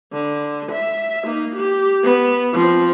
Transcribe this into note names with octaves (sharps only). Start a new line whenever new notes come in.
D3
E5
A#3 D#4
G4
B3
F3 C4